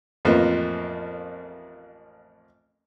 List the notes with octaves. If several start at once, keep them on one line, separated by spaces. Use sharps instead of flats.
A1 F2 F3 A#3 B4 D#5